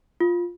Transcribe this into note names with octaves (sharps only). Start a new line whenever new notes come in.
F4